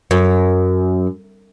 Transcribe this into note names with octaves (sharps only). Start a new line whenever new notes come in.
F#2